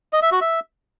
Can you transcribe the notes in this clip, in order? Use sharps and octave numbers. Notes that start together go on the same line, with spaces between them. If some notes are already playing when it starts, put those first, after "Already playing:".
D#5
E5
F#4
E5